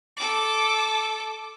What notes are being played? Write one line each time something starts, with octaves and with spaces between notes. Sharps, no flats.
A4 D6